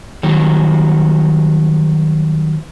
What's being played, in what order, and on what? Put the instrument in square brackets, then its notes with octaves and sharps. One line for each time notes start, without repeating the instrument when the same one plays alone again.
[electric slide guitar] D#3 F#3 G3